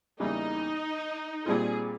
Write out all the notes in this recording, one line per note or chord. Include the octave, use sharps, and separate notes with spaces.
E2 C#3 E3 G3 A#3 D#4
A#2 G3 C4 F4 G#4